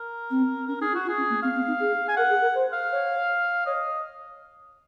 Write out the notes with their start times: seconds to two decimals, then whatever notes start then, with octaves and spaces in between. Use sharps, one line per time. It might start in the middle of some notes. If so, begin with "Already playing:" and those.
Already playing: A#4
0.30 C4
0.68 C#4 A#4
0.80 D#4 G#4
0.92 F4
0.95 F#4
1.05 F4
1.09 G#4
1.17 C#4
1.30 A#3
1.42 C4 F5
1.55 C4
1.67 D#4
1.80 G#4
2.09 G#5
2.17 A#4 F#5
2.29 G#4
2.42 A#4
2.54 C5
2.73 F5
2.92 C#5
3.66 C#5 D#5